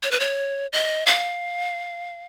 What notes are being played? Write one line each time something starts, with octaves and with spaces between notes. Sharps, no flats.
C#5
B4
C#5
D#5
F5